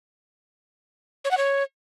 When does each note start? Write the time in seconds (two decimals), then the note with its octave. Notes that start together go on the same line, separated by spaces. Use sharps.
1.25 C#5
1.31 F#5
1.37 C#5